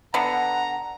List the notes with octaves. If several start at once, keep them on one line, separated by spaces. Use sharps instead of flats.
D3 B3 F#5 A#5